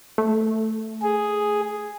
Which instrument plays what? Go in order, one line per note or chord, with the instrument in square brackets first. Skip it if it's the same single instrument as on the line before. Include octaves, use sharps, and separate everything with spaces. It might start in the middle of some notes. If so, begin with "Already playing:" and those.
[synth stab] A3
[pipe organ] G#4